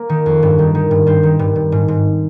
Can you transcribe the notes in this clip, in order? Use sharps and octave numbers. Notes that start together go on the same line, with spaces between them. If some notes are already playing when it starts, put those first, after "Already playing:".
Already playing: A#3
D#3
F2
G2
D#3
D#3
G2
G2 C4
D#3
G2
G2
G#2
G#2